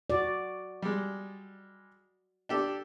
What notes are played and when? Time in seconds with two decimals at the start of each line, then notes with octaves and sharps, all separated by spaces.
0.10 F#4 D5
0.82 G3 G#3
2.49 D4 G4 A4